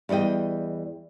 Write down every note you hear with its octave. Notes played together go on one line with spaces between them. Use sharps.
E2 G3 D5 D#5 G5